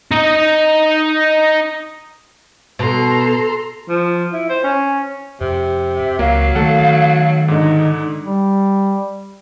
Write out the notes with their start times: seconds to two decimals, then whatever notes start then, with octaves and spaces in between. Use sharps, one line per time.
0.11 D#4 D#5
2.79 B2 A4 A#5 C6
3.89 F3
4.33 E4
4.49 C5
4.64 C#4
5.41 F2 C3
5.95 E5
6.19 C#2 F#3 A#3 F#4 F5
6.55 D#3 A3 A4 F#5
7.48 G#2 D3 D#4
8.23 G3